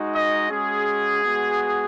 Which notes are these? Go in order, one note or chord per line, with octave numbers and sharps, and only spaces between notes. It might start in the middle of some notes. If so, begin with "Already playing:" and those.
Already playing: G#3 D#4 F#4
D#5
G#3 C#4 F#4 G#4
G#3 B3 F#4